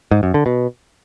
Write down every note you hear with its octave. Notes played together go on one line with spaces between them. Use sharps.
G#2
F#2
D3
B2